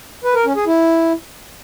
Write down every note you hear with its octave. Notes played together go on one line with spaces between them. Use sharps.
B4
A#4
C#4
G#4
E4